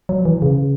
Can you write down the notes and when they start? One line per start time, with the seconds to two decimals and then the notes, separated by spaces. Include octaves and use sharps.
0.09 F#3
0.25 E3
0.42 C#3